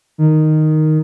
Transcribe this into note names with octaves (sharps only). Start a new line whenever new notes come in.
D#3